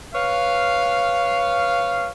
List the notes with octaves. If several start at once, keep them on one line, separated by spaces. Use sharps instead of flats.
B4 C#5 F5